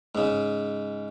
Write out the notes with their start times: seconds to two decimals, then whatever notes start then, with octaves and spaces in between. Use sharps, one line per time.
0.15 G#2 C#3